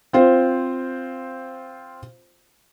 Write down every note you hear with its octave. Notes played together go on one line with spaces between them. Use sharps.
C4 F4 C5